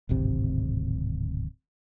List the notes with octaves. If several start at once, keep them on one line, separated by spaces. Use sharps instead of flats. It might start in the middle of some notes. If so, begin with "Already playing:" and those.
D1 G#1 C3